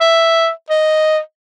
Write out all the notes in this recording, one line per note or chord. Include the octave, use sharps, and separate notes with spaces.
E5
D#5